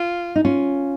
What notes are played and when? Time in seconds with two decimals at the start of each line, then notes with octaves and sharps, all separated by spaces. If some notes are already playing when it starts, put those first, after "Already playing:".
Already playing: F4
0.36 D#4
0.45 C#4 F4